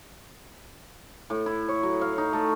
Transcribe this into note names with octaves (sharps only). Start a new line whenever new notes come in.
A2
E4
C#5
F#3
F5
D#4
A3